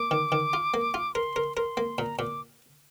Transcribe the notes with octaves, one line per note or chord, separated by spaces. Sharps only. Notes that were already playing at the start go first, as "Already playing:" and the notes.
Already playing: A#3 D6
D#3
D#3
F4
A#3
F4
A#4 C6
A#4
A#4 C6
A#3
A#2 A#5
A#2 D6